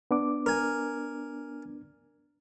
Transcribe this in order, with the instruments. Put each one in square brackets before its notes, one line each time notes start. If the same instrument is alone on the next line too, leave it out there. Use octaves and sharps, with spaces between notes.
[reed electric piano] B3 D4 D6
[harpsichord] A#4 G#5